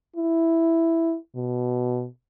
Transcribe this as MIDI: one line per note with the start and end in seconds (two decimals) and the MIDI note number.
0.16 1.16 64
1.36 2.06 47